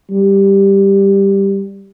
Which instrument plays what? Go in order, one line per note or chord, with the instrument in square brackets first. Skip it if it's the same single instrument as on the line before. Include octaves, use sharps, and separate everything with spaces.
[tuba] G3